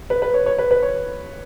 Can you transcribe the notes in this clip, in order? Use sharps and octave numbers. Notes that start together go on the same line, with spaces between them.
B4
B4
C#5
C#5
B4
B4
C#5